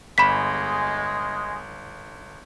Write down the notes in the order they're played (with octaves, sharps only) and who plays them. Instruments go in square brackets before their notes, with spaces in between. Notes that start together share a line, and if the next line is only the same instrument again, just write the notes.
[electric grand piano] G1 [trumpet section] G#3 [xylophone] B5 B6